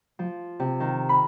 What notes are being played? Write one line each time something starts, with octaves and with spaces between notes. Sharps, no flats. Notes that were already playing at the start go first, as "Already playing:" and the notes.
F3
C3
D#3
B5